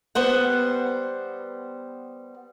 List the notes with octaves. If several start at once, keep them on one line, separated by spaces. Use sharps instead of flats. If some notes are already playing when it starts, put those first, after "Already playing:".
G3 B3 C5 F#5